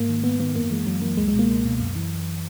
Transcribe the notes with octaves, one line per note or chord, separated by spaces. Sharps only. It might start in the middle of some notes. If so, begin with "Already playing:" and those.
Already playing: G#2 A#3
D#3
G#2 B3
D#3 B3
F#2 A#3
E3 G#3
F#2 F#3
E3 A#3
C#2 G#3
G#3
B2
A#3
C#2
B2
F#2
E3